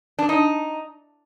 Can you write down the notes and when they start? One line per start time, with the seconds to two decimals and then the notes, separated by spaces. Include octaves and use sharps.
0.19 D4
0.29 D#4